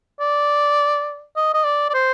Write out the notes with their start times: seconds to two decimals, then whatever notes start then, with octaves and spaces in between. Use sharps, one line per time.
0.20 D5
1.36 D#5
1.54 D#5
1.64 D5
1.90 D5
1.94 C5